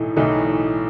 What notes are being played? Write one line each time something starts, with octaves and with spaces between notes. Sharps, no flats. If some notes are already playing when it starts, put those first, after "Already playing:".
Already playing: B1 A2 E3 A3 D#4
B1 A2 E3 A3 D#4